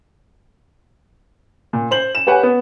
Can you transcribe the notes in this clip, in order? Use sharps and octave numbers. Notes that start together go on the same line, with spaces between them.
A#2
C5 F#7
E7
G4 B4 C#5 F#5 G#5
B3